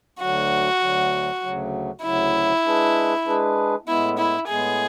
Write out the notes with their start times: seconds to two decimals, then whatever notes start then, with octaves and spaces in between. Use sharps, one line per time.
0.20 D2 D3 F#3 F#4
0.81 D2 D3 F#3
1.42 D2 C#3 F#3
2.03 D2 C#3 F#3 E4
2.65 G#3 D4 G#4 B4
3.26 G#3 D4 G#4 B4
3.87 A2 G#3 B3 E4
4.18 E4
4.48 A2 G#3 B3 G#4